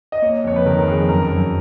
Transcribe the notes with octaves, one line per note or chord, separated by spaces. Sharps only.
D#5
A#3 C#5
F2 C#5
B4
D#3 A#4
A#4
F2 G#4
F#2 A#4
F#2